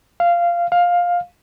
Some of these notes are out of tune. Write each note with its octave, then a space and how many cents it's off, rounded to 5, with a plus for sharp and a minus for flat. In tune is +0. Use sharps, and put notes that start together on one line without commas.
F5 -15
F5 +10